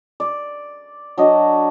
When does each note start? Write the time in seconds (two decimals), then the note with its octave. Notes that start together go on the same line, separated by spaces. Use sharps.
0.20 D5
1.18 F#3 D4 D#5